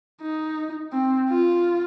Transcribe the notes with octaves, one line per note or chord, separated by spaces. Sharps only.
D#4
C4
F4